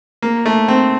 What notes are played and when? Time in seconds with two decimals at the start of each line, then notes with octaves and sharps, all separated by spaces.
0.22 A#3
0.46 A3
0.68 C4